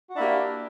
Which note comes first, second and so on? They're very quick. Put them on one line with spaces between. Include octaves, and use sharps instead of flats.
F#4 D4 E4 A#3 G4